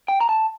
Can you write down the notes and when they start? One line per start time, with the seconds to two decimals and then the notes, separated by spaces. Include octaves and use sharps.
0.08 G5
0.21 A#5
0.29 A5